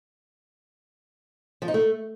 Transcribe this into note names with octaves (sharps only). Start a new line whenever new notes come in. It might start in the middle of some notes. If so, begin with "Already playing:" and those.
F3
D#4
A3